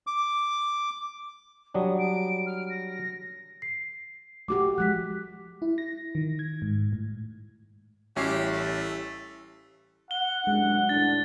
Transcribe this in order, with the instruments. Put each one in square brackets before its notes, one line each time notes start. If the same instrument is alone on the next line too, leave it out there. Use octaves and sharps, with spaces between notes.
[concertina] D6
[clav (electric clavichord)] F#3 G3 D4 [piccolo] D#6
[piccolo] D7
F6
A#6
[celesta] C7
[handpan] A3 F#4 G4 [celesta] D6
[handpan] F3 G#3 [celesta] F#6 B6
[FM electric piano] E4
A#6
D#3
G#6
G#2
A2
[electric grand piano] A1 C7 [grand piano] G3 E4 [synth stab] C#4 [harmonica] G4
[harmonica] A3
[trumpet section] F#5 [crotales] G7
[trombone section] C2 F#2 D4 [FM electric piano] G#3
[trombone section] D#2 A2 D4 [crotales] A6